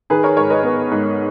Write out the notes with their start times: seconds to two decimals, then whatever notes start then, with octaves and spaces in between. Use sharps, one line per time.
0.10 D#3 G#4 B4
0.23 A#4 C#5
0.36 G#2 A#4 C#5
0.50 B4 D#5
0.63 B3
0.91 G#2